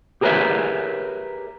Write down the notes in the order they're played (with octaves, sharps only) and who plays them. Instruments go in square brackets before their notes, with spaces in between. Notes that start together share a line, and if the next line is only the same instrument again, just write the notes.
[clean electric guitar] G4 G#4 A#4 B4 C#5 E5